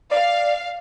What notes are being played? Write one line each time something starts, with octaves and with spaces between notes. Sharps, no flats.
D5 F5